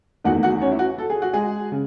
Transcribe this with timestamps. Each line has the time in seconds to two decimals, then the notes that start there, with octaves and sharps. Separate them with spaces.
0.24 E2 D#3 A3 F#4 F#5
0.43 F#4 F#5
0.61 C#4 C#5
0.71 E4
0.79 F#4
0.98 A4
1.10 G#4
1.22 F#4
1.33 G#3 G#4
1.72 C#3